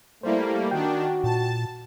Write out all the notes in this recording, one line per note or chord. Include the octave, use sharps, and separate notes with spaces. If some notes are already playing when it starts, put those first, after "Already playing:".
G3 A3 A#3 E4 C5
D#3 D4 F#4 G5
A#2 A5